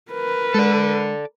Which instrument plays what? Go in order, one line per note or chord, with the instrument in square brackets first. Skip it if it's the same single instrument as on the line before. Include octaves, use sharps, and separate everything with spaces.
[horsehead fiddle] A#4 B4
[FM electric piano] G#3 [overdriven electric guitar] A4 D5